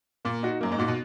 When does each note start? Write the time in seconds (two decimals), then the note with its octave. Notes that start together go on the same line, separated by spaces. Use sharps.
0.25 A#2 A#3
0.43 D#4 F#4
0.61 F#2 A#3
0.72 G#2
0.79 A#2 D#4 F#4
0.88 B2